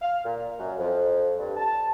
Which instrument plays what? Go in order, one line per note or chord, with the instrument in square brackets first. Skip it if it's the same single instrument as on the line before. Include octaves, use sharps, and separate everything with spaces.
[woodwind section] F5
A#2
F#2
F2
G2
A5